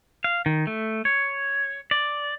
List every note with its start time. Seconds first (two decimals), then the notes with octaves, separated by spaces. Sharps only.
0.24 F5
0.46 D#3
0.67 A3
1.05 C#5
1.91 D5